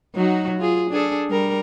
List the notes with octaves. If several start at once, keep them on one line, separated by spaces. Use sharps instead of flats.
F#3 D#4 F#4
F4 G#4
D4 G#4 A4
G3 A#4